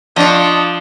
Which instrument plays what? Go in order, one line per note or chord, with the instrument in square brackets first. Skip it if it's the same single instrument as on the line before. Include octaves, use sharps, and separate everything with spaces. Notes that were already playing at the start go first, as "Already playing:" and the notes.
[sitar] F3 [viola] D4 [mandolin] D#5 C#6